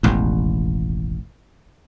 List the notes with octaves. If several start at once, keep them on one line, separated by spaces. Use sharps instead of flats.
E1 A1 D#2